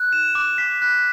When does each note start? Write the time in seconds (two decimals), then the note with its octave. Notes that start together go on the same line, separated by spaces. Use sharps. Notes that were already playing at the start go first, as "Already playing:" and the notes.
Already playing: F#6
0.13 E7
0.35 D6
0.58 B6
0.82 F#6